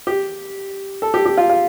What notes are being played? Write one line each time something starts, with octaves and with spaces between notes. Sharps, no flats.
G4
A4
G4
G4
F4
F4